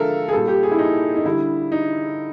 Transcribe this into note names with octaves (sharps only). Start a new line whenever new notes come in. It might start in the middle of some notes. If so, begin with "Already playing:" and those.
Already playing: D3 F3 G#3 A4 A#4 E5 F5
G#4
A#2 G3 A4
G4
G#4
E4
D#4
D#4
D3 G3 E4
D#4